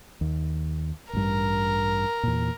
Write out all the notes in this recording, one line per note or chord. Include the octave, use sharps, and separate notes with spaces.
D#2
A1 G2 A#4
E2 A#2